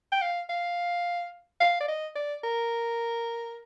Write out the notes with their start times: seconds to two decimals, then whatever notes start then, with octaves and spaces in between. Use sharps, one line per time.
0.12 G5
0.21 F5
0.49 F5
1.60 F5
1.80 D5
1.88 D#5
2.15 D5
2.44 A#4